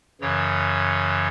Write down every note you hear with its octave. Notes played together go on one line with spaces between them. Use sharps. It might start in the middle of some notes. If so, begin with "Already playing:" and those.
F#2 C#3 E3 C#5